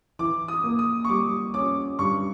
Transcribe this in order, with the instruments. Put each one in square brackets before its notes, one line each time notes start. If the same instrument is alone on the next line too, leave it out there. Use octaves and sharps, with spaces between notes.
[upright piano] E3 [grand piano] D6
[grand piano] D#6
[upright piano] A#3
[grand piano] D#6
C#6
[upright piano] G3 [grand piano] D6
[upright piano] C#4 [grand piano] D6
[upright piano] G2 [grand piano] C#6